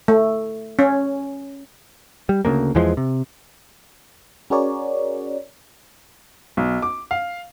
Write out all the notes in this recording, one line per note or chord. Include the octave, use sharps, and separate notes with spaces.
A3
C#4
G3
D2 C#3 G#3 A#3
E2 E3 F3 G#3
C3
C#4 F#4 G#4 A#4 C#5 D5
B1
D6
F5